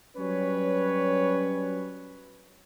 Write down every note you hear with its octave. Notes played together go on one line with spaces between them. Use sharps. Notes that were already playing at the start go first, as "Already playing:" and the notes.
F#3 G3 C#4 B4 C#5